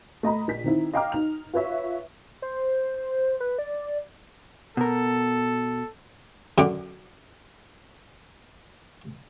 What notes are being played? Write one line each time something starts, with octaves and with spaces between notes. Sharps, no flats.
A3 D#5 A#5 B5
A#1 B6
D#3 C4 D#4 E4
D#5 F5 G5 A#5 D6 F6
D#4 F7
F4 B4 C#5 E5
C5
B4
D5
B2 A4 A#4
F#2 D3 F#5 D6